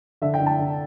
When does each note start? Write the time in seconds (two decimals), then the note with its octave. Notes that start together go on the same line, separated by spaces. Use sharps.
0.22 D3 E5
0.34 G5
0.40 D3
0.47 A5
0.59 D3